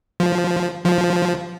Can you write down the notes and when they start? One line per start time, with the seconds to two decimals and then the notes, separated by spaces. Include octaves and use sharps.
0.20 F3
0.86 F3